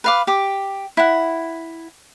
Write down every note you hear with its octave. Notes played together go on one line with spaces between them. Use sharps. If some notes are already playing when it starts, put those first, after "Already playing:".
B4 F5 D6
G4 D6
E4 F#5